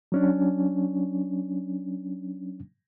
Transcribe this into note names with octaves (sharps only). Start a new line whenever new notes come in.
F#3 C#4 D4